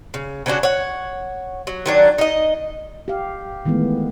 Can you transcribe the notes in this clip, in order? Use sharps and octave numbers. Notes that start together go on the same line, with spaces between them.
C#3
C#3 C#4 D4 F#4
C#5 F#5
F#3
D#3 F#3 D4
D#4 D#5
G4 F5
D#3 E3 G#3 A3 B3